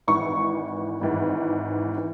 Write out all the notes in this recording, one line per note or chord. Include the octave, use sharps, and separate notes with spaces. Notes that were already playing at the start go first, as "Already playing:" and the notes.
G#1 G#2 E3 C#6
G#1 G#2 E3
E3